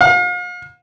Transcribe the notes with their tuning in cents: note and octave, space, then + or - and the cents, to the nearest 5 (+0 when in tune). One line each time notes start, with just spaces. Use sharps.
F5 +40